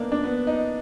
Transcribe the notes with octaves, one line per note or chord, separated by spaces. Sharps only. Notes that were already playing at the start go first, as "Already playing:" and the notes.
Already playing: A#3 B3 D4 D#4
D4
B3
D#4